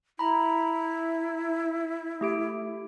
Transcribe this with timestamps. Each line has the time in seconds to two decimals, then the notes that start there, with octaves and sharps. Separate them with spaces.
0.19 E4 A#5 B5
2.21 A3 G4 D7